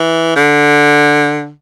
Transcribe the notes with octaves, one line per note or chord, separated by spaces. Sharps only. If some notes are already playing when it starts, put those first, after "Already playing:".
Already playing: E3
D3